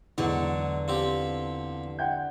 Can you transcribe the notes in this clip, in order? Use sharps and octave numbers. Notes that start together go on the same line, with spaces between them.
E2 G#2 D3 F#3
F3 C4 G4
F#5 G5 G6